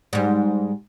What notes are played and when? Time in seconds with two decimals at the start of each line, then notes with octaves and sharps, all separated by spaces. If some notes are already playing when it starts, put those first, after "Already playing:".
0.13 G#2 G3